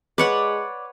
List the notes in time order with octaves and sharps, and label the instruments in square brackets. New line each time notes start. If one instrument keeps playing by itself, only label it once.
[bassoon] G#3 [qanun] B4 C#5 F#5 [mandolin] D5